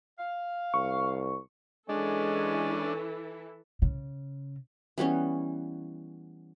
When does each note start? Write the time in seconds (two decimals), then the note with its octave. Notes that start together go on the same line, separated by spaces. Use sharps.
0.18 F5
0.74 C2 C#6
1.89 E3 G#3 C#4 D4 E4 A4
3.82 C#3
4.98 E3 G3 B3 C#4